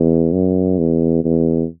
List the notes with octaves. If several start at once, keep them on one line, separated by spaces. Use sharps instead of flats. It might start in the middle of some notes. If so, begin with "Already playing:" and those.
Already playing: E2
F#2
E2
E2